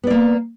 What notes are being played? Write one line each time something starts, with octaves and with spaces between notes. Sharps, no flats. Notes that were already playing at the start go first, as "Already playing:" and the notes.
A#3 B3 D5